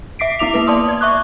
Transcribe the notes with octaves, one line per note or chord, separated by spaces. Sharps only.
E5 D6 B6 C7 D7
B3 E4 D6 F7
A#3 B4
D5 A5 C6 D#6
D5 G#6
E5 C#6 D6 F#6